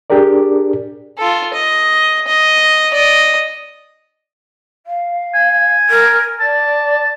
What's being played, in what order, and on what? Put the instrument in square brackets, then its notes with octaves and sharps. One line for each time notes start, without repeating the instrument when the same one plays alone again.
[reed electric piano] D4 G4 G#4 A#4 D5
[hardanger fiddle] F4 A4
D#5
D#5
D5 D#5
[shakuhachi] F5
[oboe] G#5
[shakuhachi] A#4
[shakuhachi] D5 [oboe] A5